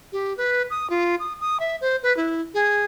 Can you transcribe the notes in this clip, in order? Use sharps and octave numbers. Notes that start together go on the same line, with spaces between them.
G4
B4
D#6
F4
D#6
D#6
E5
C5
B4
E4
G#4